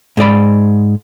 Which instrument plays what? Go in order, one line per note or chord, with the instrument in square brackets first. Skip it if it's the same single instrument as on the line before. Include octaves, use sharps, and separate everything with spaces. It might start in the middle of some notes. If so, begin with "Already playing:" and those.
[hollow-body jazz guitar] G#2 G#3 D5 B5